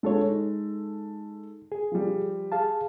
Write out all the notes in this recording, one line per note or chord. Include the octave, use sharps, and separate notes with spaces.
G#3 D4 F4 A4 C#5
D#4
G#4
F3 G3
G#4 F5 A5